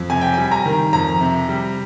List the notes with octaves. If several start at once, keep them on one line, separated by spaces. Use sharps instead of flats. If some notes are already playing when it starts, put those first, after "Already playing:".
Already playing: F2
C3 G#5
G5
G3 G#5
A#5
D#3
F2 A#5
C3
G3